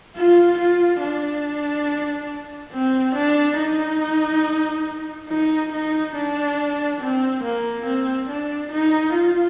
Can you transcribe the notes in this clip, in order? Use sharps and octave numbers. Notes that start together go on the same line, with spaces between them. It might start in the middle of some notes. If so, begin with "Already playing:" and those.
F4
F4
D4
C4
D4
D#4
D#4
D#4
D4
C4
A#3
C4
D4
D#4
F4